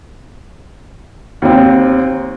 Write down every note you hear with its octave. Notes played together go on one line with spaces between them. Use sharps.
D#2 C4